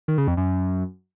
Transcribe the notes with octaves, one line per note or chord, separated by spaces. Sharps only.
D#3
C#3
F2
F#2